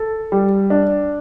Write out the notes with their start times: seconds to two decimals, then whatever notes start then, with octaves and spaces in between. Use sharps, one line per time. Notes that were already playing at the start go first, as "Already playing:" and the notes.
Already playing: A4
0.32 G3
0.70 D4